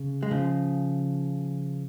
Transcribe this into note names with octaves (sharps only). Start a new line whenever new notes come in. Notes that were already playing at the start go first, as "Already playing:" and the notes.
Already playing: C#3
G#3
C#3 F3